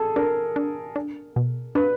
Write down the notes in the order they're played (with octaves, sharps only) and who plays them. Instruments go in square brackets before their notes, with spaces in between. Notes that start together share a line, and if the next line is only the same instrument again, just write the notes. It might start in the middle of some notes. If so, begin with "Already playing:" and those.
Already playing: [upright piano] G#4 A4
[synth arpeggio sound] D4 [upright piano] A#4
[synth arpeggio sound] D4
D4
B2
[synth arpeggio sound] D4 [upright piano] B4